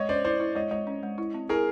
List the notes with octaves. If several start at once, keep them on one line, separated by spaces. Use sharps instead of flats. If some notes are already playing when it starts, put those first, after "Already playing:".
Already playing: G#3 C#5 D#5
C#4 C5 D5
E4 C5 D5
E4
G#3 C#5 D#5
G#3 C#5 D#5
C#4
G#3
E4
C4
E4 G#4 A#4